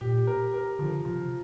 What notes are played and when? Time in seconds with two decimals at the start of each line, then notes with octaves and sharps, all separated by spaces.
0.01 A#2 G4
0.27 A#4
0.54 A#4
0.79 D3 F3
1.05 C3 F3